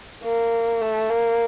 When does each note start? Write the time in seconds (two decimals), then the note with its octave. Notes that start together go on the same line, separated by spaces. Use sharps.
0.24 A#3
0.81 A3
1.09 A#3